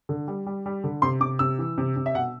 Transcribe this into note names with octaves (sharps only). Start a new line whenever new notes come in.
D3
G3
G3
G3
D3
C3 C6
C3 D6
C3 E6
E3
C3
C3
E5
B2 F#5